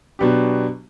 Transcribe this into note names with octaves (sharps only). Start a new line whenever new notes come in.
B2 F#3 B3 D4 G4